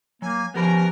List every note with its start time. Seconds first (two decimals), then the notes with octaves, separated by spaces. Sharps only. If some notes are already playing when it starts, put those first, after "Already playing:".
0.22 F#3 A#3 G#5
0.54 F3 B3 C#4 G4 A#4 B5